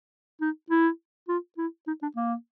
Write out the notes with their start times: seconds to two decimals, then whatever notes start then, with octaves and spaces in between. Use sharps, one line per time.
0.41 D#4
0.70 E4
1.29 F4
1.58 E4
1.87 D#4
2.02 D4
2.16 A#3